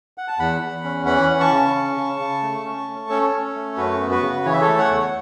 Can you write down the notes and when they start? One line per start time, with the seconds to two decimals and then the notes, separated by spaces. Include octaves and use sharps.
0.18 F#5
0.28 A5
0.39 E2 F#5 B5
0.62 E2
0.84 C#4
1.06 E3 F#5 B5
1.30 C#4
1.40 A5 C#6
1.52 C#3
1.74 C#4
1.97 C#3
2.20 C#3
2.43 A3
2.65 C#4
2.88 A3
3.10 C#4 A4 C#5
3.33 C#4
3.55 A3
3.77 F#2 F#4 B4
4.00 B3
4.11 F#4 B4
4.23 C#3
4.46 E3 C#5
4.53 E5
4.61 A4 C#5
4.68 A3
4.79 C#5 F#5
4.91 E2